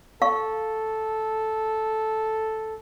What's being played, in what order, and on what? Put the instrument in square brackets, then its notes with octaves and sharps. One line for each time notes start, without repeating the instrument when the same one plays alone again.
[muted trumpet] A4 [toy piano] F5 C#6